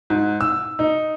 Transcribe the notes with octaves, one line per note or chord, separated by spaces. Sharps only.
G#2
E6
D#4